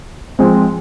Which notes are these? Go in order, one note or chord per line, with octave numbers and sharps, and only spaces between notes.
F3 G#3 C4